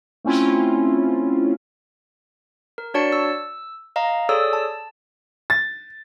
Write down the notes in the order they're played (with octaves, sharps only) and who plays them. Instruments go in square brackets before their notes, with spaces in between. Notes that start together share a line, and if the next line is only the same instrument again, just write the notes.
[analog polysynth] A3 C4 C#4 E4 F4
[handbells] A#4
D4 F#4 C#5 D5 A5 C#7
E6
D#5 F5 A#5
G#4 A4 C#5 D5 D#6 E6
A5
[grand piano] A6